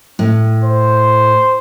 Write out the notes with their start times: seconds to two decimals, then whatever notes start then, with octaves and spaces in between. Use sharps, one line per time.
0.19 A2
0.64 C5